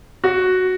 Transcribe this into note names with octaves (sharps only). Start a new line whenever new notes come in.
F#4